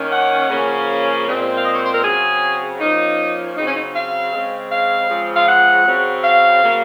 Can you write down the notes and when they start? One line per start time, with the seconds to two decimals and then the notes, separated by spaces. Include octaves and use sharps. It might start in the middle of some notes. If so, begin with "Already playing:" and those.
Already playing: D#3 A#3 C#4
0.12 F#5
0.50 C#3 F3 A#3 C#4
1.27 A#2 G#3 C4
1.58 F5
1.65 D#5
1.74 C#5
1.84 C5
1.94 A#4
2.03 C#3 F#3 C4 G#4
2.80 F3 A#3 C#4 D#4
3.56 C#3 F#3 C4 D#4
3.66 C#4
3.75 D#4
3.94 F5
4.33 C#3 G#3 C4
4.71 F5
5.09 C#3 F3 G#3 C4
5.35 F5
5.47 F#5
5.86 C#3 F#3 C4
6.24 F5
6.62 C#3 F#3 A#3